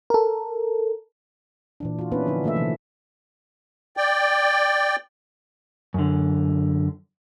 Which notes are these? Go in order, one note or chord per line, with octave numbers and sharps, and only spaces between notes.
A4 A#4
A#2 E3 D4
F4 F#4
A#3 B3 C#4 D4 E4 B4
D3 F3 D4 D#4
D#3 A3 A#3 A4 E5
C3 E3 F3 C4
D5 G5
F#2 D3